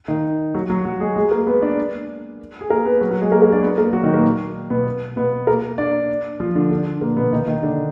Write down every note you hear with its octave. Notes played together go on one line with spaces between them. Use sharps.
D#3 D#4
F#3 F#4
F#3 F#4
F#3 F#4
G#3 G#4
G#3 G#4
A#3 A#4
B3 B4
D4 D5
G#4
A#3 A#4
B3 B4
F#3 F#4
F#3 F#4
G#3 G#4
A#3 A#4
A#3 A#4
D4 D5
B3 B4
A#3 A#4
F#3 F#4
D#3 D#4
A#2 A#3
B2 B3
B2 B3
A#3 A#4
D4 D5
F3 F4
D3 D4
D3 D4
A#2 A#3
B2 B3
D#3 D#4
D#3 D#4
D3 D4